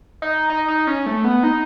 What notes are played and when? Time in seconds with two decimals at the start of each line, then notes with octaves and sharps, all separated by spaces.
0.22 D#4
0.50 D#4
0.68 D#4
0.87 C#4
1.06 A3
1.24 B3
1.43 D#4